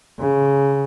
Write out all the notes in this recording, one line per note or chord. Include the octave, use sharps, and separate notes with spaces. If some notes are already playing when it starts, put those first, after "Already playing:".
C#3